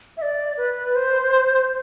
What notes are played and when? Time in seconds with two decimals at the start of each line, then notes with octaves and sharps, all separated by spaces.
0.17 E5
0.22 D5
0.57 B4
0.95 C5